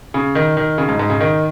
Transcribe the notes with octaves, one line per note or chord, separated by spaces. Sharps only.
C#3
D#3
D#3
C#3
G#2
G#2
C#3
D#3